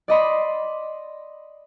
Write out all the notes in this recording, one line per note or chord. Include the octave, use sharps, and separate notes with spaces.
D5 D#5 B5 C6